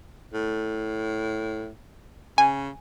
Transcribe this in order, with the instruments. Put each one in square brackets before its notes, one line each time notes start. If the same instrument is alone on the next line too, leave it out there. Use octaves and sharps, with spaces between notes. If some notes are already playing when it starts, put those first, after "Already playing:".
[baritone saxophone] A2
[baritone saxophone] C#3 [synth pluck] G#5